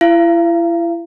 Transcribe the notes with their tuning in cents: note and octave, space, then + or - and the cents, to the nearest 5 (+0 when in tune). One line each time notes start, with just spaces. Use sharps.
E4 +30 F5 -40